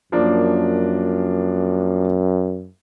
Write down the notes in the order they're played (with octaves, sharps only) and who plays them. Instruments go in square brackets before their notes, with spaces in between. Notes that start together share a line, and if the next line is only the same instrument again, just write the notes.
[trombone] F#2 [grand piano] F3 A#3 D4